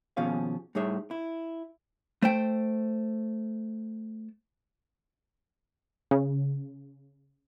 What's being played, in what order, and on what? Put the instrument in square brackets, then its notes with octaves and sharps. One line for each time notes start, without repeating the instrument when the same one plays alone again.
[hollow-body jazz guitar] D#2 B2 F3 C#4 G#4 F5
A2 G3 D#4 G#4 C#5 E5
E4
A3 C5 G5
[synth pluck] C#3